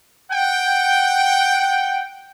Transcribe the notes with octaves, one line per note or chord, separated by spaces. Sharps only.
F#5 G5